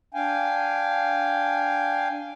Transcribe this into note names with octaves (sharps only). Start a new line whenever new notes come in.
D4 F5 G5 G#5